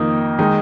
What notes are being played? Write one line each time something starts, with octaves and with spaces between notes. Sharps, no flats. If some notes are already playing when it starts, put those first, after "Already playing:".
Already playing: F2 D#3 A#3 D#4
D#3 G#3 D#4